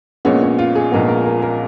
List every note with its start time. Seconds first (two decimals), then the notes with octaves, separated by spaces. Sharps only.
0.25 A#1 A#2 G#3 B3 C#4
0.43 C#4
0.59 F4
0.75 G#4
0.92 A#1 A#2 G#3 B3 A#4
1.09 A#4
1.26 A#4
1.42 A#4